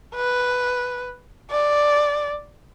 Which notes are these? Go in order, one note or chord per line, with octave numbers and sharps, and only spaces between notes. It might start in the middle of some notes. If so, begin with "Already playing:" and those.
B4
D5